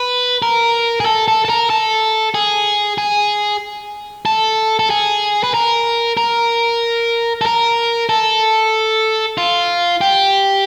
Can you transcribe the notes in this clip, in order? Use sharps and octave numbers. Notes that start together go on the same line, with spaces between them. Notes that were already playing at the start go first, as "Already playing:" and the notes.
Already playing: B4
A#4
G#4
A4
A4
A4
A#4
A4
G#4
G#4
A4
A4
G#4
B4
A#4
A#4
A4
A#4
A4
F4
G4